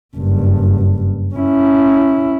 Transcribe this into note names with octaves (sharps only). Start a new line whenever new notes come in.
F#1 G2
C#4 E4